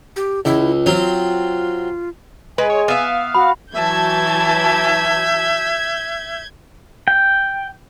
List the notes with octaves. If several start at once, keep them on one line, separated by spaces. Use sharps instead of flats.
G4
C#2 E4
F#3 C4 F4
G#3 B4 G#5
C#5
B3 E5 F5
F#4 B5
E3 F#3 E5 A5 G6 G#6
G5